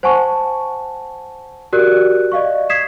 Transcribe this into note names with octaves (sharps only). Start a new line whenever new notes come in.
C5 F#5 G#5 A5 C#6
F#4 G4 A#4 D5 F#6
D5 D#5 F5 C#6
D#6 G#6 B6 C7 E7